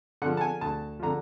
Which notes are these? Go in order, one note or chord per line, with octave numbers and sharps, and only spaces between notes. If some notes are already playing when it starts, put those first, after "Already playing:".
D3 F3 F#5
A5
G#5
D2 A5
D3 F3 A#5